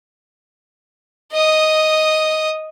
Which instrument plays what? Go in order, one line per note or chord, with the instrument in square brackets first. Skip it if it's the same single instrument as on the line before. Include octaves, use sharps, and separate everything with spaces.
[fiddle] D#5 D#6